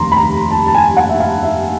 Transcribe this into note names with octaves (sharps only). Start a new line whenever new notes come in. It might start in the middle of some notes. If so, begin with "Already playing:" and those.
Already playing: F1 D#2 A#5 C6
B5
A#5
A5
A5
G#5
F#5
E5
F5
E5